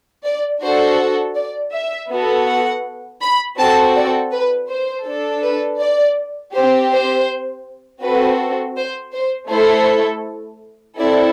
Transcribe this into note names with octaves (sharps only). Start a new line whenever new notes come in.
D5
D4 F#4 A4 C5
D5
E5
B3 F#4 A4
F#5
B5
C4 F#4 A4 A5
D5
B4
C5
D4 A4
B4
D5
C4 G4 C5
C5
C4 F#4 A4 B4
C5
C5
A3 E4 A4 C5
C4 E4 A4 D5